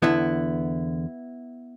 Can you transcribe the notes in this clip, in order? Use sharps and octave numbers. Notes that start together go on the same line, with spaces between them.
E2 D3 B3 E4